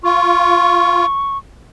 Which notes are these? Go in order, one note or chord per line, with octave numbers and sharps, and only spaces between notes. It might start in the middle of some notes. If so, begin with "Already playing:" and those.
F4 C#6